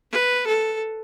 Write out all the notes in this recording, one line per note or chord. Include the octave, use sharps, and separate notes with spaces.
B4
A4